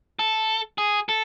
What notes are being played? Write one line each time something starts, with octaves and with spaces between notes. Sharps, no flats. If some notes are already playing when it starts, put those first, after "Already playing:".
A4
G#4
A4